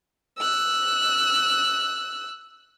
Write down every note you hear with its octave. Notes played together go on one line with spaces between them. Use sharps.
E6 F#6